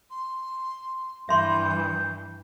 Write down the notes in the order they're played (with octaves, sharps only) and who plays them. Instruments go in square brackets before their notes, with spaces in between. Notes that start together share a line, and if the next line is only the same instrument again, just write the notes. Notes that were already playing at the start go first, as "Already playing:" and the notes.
[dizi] C6
[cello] G2 E3 [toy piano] E5 C6 C#6 [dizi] G6